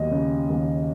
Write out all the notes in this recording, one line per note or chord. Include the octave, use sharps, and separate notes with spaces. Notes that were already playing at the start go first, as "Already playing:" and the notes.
Already playing: D#2 F#3 D#5
C#3
D#2